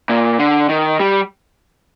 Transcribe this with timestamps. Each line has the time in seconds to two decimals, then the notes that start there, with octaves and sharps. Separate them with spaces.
0.09 A#2
0.39 D3
0.69 D#3
1.00 G3